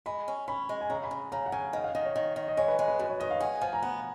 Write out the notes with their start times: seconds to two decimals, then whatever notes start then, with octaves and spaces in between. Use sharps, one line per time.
0.06 G#3 B5
0.28 C#4
0.48 C#4 B5
0.69 G#3
0.81 G#5
0.90 C#3 A#5
1.04 B5
1.11 C#3
1.32 C#3 A#5
1.46 F#5
1.52 C#3 G#5
1.73 D#3 F#5
1.84 F5
1.95 D#3 D#5
2.05 C#5
2.16 D#3
2.36 D#3
2.48 D#5
2.57 G#3 C#5
2.68 B4
2.79 G#3
2.88 B4
2.99 F#2 B4
3.09 C#5
3.20 D#3 D#5
3.31 F5
3.40 G#4 F#5
3.62 F3 G#5
3.73 A#5
3.82 B3 F#5